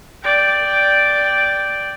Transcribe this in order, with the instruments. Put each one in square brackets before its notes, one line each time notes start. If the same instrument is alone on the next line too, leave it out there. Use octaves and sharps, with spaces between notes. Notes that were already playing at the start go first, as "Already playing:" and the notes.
[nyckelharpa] D5 G5